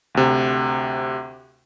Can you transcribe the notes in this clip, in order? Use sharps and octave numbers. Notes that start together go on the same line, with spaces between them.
D2 C3